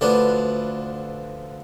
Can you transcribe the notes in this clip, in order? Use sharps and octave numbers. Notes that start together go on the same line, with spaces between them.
D2 F3 D4 B4